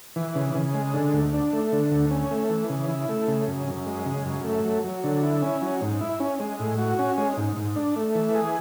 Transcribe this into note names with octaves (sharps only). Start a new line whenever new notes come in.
E3
C#3
C#3
G#3
D3
D2
D4
A3
D3
D2
C#4
A3
E3
C#3
E4
A3
C#3
F#2
F#2
G#3
C#3
F#2
A3
F#3
F#3
D3
E4
C#4
F#3
G#2
E4
C#4
G#3
A2
F#4
C#4
G#3
G#2
G#2
D4
A3
E3
G#4